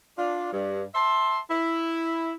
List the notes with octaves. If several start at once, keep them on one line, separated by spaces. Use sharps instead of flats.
D4 F4
G2
E5 A5 C6
E4